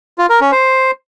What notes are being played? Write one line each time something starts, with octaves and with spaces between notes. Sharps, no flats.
F4
A#4
C#4
C5